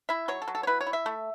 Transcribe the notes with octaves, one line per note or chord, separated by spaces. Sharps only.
E4 E5
F#3 C#5
A4
F#3
A4
C#5
E4 B4
C#5
E4
E5
A3